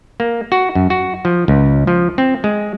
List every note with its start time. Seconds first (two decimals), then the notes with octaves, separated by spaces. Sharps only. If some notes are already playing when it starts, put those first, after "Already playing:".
0.20 A#3
0.52 F#4
0.75 F#2
0.90 F#4
1.25 F3
1.48 C#2
1.87 F3
2.18 C4
2.44 G#3